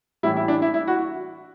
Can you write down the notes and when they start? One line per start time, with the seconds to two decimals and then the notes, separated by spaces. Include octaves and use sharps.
0.23 A2 E3 G3 E4
0.37 E4
0.48 D4
0.62 E4
0.74 E4
0.88 F#4